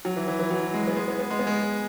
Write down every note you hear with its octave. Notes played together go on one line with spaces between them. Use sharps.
F#3
E3
E3
E3
F#3
G#3
B3
G#3
B3
B3
G#3
B3
G#3